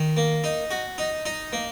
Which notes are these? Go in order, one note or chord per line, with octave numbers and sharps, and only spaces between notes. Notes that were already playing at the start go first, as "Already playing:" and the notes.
Already playing: D#3
A#3
D#4
F#4
D#4
D#4
A#3